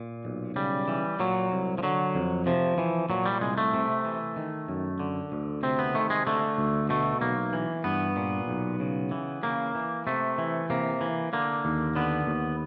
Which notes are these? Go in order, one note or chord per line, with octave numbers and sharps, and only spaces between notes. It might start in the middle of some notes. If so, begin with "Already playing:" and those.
Already playing: A#2
B1
C#3 G3
E3
A#2 F#3
C2
F3
D3 F#3
F2
C3 F3
E3
A#2 F#3
G3
C2 G#3
A3
C3
E3
D#3
F#2
D3
D2
C3 C4
B3
D#3 A3
G#3
D3 A3
D2
B2 A3
B1 A#3
E3
G2 B3
A#2
B1
C#3
E3
C#3 A#3
E3
C3 A3
E3
C3 A#3
E3
D3 A#3
D#2
D3 B3
D#2